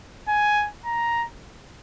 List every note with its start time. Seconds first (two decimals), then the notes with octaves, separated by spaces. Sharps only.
0.29 G#5
0.86 A#5